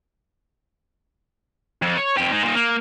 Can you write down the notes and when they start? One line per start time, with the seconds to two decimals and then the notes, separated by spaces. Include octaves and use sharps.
1.82 F2
1.97 C#5
2.17 F2 G4
2.32 G#3 D#4
2.43 A#2 D#4
2.56 A#3